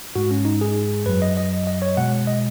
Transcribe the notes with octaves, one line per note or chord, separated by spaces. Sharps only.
G#2 G#3 F#4
C#4
D#4
G#4
F#2 F#3 B4
D#5
D#5
D#5
C#5
B2 G#3 F#5
D#5